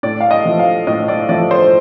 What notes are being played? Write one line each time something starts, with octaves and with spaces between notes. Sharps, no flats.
A2 D5
F5
D#5
F3 A3
F5
A2 D#5
D5
F3 A3 D5
C5